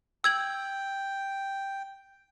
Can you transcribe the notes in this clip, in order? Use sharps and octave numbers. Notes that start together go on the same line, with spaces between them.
G5 E6 G#6 F#7